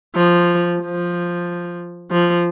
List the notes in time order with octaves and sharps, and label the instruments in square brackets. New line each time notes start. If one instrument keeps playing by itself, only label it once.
[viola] F3
F3
F3